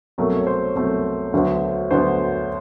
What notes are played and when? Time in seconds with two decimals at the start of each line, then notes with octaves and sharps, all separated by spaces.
0.18 C2 B2 F#3 A3 A#4
0.37 C#5
0.47 C5
0.75 C2 B2 F#3 A3
1.33 D2 D3 F#3 B3
1.91 D2 D3 F#3 B3 C5